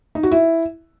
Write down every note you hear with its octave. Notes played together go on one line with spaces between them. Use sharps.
D#4
F#4
E4